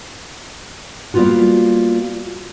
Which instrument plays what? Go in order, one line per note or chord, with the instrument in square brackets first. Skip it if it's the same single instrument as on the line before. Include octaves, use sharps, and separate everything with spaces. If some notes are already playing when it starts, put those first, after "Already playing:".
[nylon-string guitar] G3 A#3 B3 F4 F#4